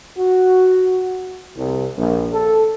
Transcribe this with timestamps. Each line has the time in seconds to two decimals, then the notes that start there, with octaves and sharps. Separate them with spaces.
0.17 F#4
1.56 C2
1.97 A#1
2.33 A4